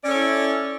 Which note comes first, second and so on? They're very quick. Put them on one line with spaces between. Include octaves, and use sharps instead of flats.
D5 C#4 A4 C#5 E4